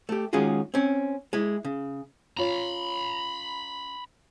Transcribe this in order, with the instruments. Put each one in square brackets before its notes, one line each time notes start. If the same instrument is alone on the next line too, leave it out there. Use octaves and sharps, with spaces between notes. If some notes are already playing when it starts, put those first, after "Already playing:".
[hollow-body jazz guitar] A3 G4
D#3 G#3 C#4 F4 F#4 G#4
C4 C#4
G#3 E4
C#3
[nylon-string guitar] C#4 F4 C#5 [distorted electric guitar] A#5 B5